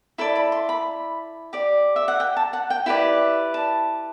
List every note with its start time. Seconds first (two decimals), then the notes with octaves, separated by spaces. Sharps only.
0.18 E4 A4 D5 B5
0.36 B5
0.52 C6
0.69 B5
1.53 G4 D5
1.96 E5
2.08 F#5
2.20 G5
2.37 A5
2.53 F#5
2.70 G5
2.86 E4 G4 B4 D5 G5
3.54 A5